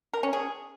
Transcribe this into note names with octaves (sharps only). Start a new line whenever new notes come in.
A#4
C#4
G#4